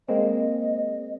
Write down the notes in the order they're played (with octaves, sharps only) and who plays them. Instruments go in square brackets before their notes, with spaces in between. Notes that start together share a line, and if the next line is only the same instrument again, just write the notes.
[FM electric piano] G#3 A#3 C4 [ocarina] D#5